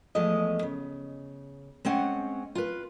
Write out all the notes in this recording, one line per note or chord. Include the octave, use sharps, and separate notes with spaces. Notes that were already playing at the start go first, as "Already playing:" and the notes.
E2 F3 G#3 A3 D#5
C#3
G#3 C4 C#4 F#5
F4 B4